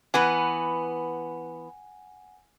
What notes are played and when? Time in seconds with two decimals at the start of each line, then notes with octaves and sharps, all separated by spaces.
0.14 E3 B3 B4 F#5 G#5